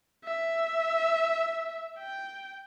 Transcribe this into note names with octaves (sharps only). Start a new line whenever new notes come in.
E5
G5